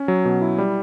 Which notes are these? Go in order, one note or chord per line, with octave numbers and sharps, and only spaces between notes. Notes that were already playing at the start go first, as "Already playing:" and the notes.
Already playing: C#4
F#3
B2
E4
G3